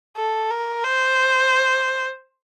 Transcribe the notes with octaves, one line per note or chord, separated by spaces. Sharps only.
A4
A#4
C5